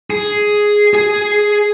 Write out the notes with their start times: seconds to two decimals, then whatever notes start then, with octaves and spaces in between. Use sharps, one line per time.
0.10 G#4
0.94 G#4 G#5